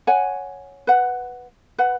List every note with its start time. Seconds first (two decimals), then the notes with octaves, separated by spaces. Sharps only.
0.07 C#5 F#5 G#5
0.87 B4 F#5
1.78 B4 F#5